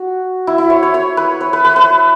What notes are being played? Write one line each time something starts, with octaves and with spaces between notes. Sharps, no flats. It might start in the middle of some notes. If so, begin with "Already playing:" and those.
Already playing: F#4
E4
E4
C#5
C#5
C#5
B4
C#5
B4
B4
B4